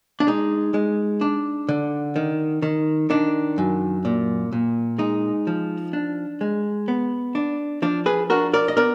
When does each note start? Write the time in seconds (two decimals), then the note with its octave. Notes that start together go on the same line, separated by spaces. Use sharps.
0.20 D4
0.27 G#3 D#4
0.74 G#3
1.21 D4
1.69 D3
2.16 D#3
2.62 D#3
3.10 D#3 D4
3.58 F#2
4.05 A#2
4.53 A#2
4.99 G#3 D#4
5.47 F3
5.93 D4
6.41 G#3
6.88 B3
7.35 D4
7.82 F3 D4
8.06 G#4 B4
8.30 D4 F#4 A#4
8.53 A#4 D5
8.68 D#5
8.77 B3 A#4 D5